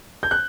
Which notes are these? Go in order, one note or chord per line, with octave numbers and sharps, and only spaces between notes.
G6
F#6